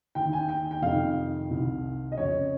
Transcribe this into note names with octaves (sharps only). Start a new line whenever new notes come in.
D#2 D#3 G5
G#5
G5
G5
F2 C3 D#3 F5
C2 C3 D#3
D#5
F2 C#3 C#5